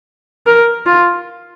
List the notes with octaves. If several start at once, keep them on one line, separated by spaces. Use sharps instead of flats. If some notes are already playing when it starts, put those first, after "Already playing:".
A#4
F4